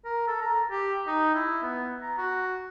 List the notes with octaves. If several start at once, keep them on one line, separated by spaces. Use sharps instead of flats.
A#4
A4
A#5
G4
D#4
E4
B3
A#5
F#4